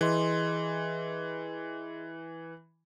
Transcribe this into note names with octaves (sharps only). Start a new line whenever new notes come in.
E3 G#4 D#5 C6